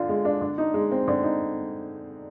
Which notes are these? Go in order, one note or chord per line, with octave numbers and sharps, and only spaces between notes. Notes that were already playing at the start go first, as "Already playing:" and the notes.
Already playing: D3 F4
G#3
D4
D3
D#4
G#3
C4
D3
D#4